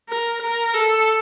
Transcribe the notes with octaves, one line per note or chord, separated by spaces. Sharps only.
A#4
A#4
A4